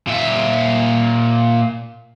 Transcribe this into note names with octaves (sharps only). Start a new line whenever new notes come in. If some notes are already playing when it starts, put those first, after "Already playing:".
A#2 E5